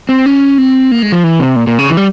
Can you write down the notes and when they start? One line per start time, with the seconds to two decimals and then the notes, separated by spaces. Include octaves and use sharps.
0.09 C4
0.26 C#4
0.58 C4
0.91 A#3
1.02 G#3
1.12 F3
1.24 E3
1.39 C3
1.56 A#2
1.67 A#2
1.78 C#3
1.90 E3
1.97 G3